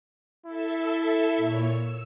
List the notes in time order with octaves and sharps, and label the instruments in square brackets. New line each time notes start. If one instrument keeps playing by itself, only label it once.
[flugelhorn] E4 [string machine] A4 E5
[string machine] A#2 C#5
E6